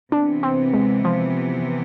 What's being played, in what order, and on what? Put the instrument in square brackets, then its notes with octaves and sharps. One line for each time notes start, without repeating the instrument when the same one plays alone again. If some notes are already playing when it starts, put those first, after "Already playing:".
[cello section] C3 E3 B3 [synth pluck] D4
[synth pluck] C4
G#3
F3